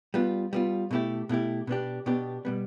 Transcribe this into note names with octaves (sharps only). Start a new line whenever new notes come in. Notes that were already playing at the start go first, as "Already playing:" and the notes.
G3 B3 F4
G3 B3 F4
B2 A3 E4 G4
B2 A3 E4 G4
B2 B3 D4 G4
B2 B3 D4 G4
B2 G3 B3